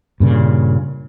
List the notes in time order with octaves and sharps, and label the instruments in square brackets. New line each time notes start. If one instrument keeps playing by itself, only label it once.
[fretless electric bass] G2 A#2 C#3